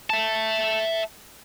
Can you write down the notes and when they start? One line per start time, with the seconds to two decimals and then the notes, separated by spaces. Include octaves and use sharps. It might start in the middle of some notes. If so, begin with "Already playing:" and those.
0.10 E5 A5